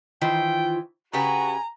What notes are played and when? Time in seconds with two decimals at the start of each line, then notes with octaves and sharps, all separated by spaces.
0.21 D#3 E3 F4 C5 G5
1.13 C#3 F#4 G4 B4 G#5 A#5